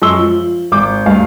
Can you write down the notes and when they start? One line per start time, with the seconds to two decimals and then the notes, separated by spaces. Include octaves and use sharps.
0.02 F#2 G#3 C6 C#6 E6 G7
0.19 F3
0.72 G#1 D6 G6
1.06 D2 G2 F5